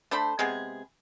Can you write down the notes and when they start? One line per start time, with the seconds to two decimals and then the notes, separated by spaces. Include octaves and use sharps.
0.11 A3 D4 C5 B5
0.39 C3 G#3 B3 G#4